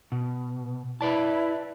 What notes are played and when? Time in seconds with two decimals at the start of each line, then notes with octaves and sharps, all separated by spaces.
0.12 B2
1.01 E4 B4 D5 A5